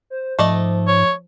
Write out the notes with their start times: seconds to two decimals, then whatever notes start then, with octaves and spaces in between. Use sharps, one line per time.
0.10 C5
0.39 G#2 F3 A3 D5 D#5
0.87 C#5